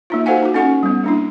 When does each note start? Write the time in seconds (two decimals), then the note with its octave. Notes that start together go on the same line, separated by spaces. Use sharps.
0.10 A#3 D#4 F4
0.26 F#4 A4 C5 F5 F#5 G#5
0.43 D#4 F#4
0.54 C#4 A4 F#5 C#6
0.83 G3 B3
1.04 A#3 D4 E4